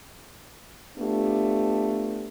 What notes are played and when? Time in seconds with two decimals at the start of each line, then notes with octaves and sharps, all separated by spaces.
0.97 A3 B3 D4 F4 G4